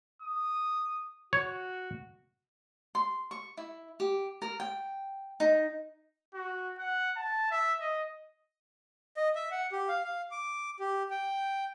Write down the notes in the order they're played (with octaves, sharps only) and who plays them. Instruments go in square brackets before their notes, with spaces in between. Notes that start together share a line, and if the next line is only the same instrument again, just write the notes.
[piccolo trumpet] D#6
[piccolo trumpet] F#4 [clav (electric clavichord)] C#5
[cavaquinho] C6
C#6
E4
G4
A#4
G5
D#4
[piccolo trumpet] F#4
F#5
A5
E5
D#5
[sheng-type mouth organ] D#5
E5
F#5
G4
F5
F5
D6
G4
G5